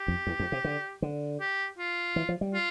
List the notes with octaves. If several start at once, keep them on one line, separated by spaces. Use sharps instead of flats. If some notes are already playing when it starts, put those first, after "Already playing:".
Already playing: G4
F2
E2
F2
C3
D3
D3
G4
F4
E3
F3
G3
F4